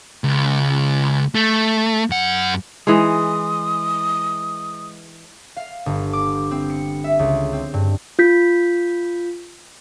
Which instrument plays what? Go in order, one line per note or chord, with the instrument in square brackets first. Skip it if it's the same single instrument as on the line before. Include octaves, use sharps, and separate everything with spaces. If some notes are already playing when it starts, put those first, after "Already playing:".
[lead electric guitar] C#2
A3
F#2 F#5
[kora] E3 G#3 [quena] D#6
[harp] F5
G1
D6
C4
C#7
E5
C#2
C4
G2
[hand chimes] F4 G6 B6